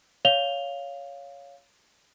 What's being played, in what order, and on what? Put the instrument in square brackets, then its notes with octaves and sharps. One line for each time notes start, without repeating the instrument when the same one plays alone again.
[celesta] C#5 F5 F7 G7